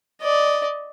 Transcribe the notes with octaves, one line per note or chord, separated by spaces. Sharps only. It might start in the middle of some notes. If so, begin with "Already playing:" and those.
D5 D#5